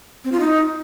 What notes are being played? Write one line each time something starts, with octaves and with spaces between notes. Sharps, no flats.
C4
F4
D#4